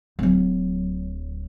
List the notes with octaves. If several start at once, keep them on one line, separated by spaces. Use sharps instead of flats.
D1 F#3